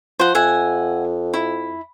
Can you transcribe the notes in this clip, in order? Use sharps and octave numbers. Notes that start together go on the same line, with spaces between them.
F3 C5 F#5
F2 E5 F#5 G#5
E4